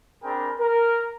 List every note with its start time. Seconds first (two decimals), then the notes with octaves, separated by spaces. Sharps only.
0.24 C4 D4 G#4 A#4 G5 B5
0.60 A#4